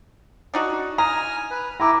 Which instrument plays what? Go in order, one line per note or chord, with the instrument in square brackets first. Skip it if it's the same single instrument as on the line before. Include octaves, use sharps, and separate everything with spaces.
[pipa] D4 D#4 F#4
[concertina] G#5 F6 [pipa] A#5 [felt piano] D#6
[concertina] B4
[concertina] E4 [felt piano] A#5 D6